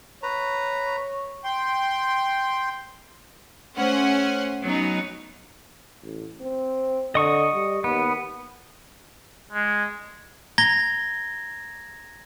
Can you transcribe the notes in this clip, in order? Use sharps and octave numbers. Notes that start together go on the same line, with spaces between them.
B4 C#5 A#5
G5 C6
A3 C#4 C5 F#5 G#5
F#3 B3 C#4 D#4
A1
C4
D3 D#5 C#6 D#6
G3
D#2 B3
G#3
A#5 G#6 A#6 G7